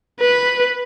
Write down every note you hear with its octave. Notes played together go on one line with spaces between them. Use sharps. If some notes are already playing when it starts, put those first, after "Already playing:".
B4